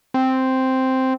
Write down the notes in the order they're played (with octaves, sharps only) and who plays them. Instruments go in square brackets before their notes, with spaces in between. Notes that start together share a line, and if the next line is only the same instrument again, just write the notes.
[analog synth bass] C4